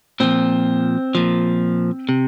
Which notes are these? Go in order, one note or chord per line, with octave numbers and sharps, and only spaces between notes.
A#2 F3 C4
A#2 F3
C3